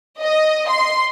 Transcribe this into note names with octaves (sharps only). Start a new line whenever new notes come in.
D#5
C6